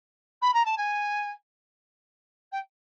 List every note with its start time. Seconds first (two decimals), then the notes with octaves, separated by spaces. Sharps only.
0.42 B5
0.54 A#5
0.65 A5
0.77 G#5
2.52 G5